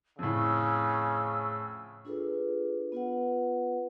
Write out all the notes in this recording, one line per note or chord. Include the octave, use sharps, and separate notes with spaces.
F2 A2 C#3 E6
D4 F4 G#4 A4 B4
B3 F4 B4 F#5